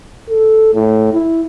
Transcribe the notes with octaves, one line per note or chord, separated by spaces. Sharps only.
A4
A2
E4